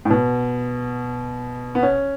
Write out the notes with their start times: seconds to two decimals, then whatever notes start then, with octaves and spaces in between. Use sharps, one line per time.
0.05 A2
0.10 B2
1.75 B3
1.83 C#4